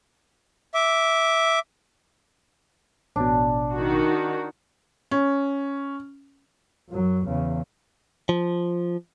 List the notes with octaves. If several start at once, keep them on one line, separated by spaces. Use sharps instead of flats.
E5 D6
A1 B2 D4
D#3 F#4
C#4
F#2 F#3
E2 C#3
F3